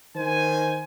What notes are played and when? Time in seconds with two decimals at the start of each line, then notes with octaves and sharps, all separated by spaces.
0.15 D#3 C5 G#5